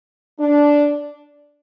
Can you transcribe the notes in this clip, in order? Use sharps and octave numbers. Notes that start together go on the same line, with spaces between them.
D4